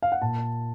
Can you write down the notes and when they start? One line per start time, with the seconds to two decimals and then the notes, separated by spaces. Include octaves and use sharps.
0.02 F5
0.12 F#5
0.22 A#2 A5